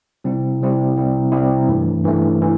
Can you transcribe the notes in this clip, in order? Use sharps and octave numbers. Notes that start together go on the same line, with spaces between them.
C3 G3 C4 E4
C3 G3 C4 E4
C3 G3 C4 E4
C3 G3 C4 E4
G2 E3 A3
G2 E3 A3
E3